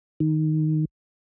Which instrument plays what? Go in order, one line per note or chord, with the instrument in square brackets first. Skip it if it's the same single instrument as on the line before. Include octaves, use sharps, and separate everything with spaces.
[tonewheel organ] D#3